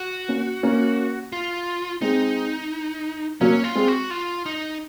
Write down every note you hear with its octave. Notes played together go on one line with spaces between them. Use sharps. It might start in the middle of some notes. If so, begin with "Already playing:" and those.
Already playing: F#4
A#3 C#4
A#3 C#4
F4
G#3 C4 D#4
F#3 A#3 C#4
F4
G#3 C4
F#4
F4
D#4